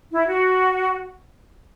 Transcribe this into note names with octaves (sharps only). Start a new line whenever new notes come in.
E4
F#4